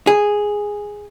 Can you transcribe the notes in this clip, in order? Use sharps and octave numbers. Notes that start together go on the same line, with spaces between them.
G#4